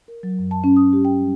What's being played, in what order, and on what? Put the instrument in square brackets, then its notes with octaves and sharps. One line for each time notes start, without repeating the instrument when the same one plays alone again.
[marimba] A#4
F#3
F#2
A5
C#4
D#6
G4
G5
G3